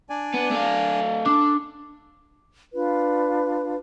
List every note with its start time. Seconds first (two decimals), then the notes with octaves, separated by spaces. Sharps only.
0.10 D4 D5 G#5
0.34 B3
0.51 A3 F5
1.26 D4 A4 D6
2.73 D4 F4 B4